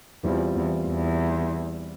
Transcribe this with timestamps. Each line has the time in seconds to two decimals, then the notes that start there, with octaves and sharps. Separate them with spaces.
0.24 E2 E3 G3 C4 F4
0.56 E2
0.87 E2